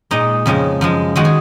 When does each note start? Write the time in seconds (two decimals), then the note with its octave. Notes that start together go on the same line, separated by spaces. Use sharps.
0.11 A#2 G#3 D#4
0.46 F2 C#3 F3 G#3
0.81 F#2 F3 G#3
1.16 D#3 G#3 F#4
1.25 G#4